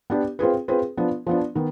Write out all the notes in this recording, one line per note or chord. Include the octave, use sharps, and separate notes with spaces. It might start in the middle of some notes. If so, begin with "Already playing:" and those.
B3 D4 G4
C4 F4 G#4 B4
C4 F4 G#4 B4
F3 B3 D4
F3 B3 D4
D#3 B3